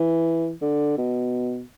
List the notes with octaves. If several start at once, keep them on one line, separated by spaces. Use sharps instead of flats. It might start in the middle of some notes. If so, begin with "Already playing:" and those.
Already playing: E3
D3
B2